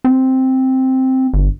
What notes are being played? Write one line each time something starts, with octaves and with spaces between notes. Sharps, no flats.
C4
G1